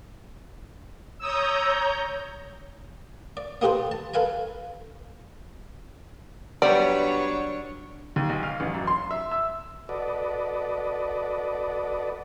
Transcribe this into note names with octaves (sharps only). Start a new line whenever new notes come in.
C#5 A#5 D#6 E6 G6
D5
A#3 D#4 G4 A4 B4 C5
A5
A4 B4 F5 G#5 A#5
F#3 G3 B3 D4 C#5 D5
D#2
B1
F5
A1
F#2
C6
E5
E6
F#4 A4 B4 D5 D#5